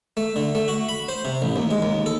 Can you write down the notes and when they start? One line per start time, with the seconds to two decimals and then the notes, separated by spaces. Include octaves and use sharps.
0.17 A3
0.36 D3
0.55 A3
0.68 F#4
0.89 B5
1.08 C5
1.25 C3
1.42 A1
1.56 D#2
1.71 G#3
1.82 D#2
2.06 A4